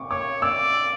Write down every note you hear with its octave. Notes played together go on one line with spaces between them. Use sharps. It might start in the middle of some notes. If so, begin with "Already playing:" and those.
Already playing: C#6 D6
C#5 D6
D5 E6